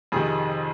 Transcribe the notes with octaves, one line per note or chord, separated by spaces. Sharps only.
F2 C3 D#3 G#4